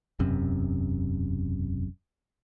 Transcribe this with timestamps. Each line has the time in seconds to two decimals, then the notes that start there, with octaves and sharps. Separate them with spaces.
0.19 E1 B1 F#2 C3